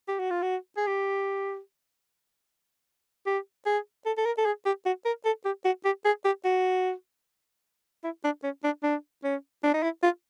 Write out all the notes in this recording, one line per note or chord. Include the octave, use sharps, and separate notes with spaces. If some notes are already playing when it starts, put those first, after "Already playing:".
G4
F#4
F4
F#4
G#4
G4
G4
G#4
A4
A4
A#4
A4
G#4
G4
F#4
A#4
A4
G4
F#4
G4
G#4
G4
F#4
E4
D4
C#4
D4
D4
C#4
D4
D#4
E4
F4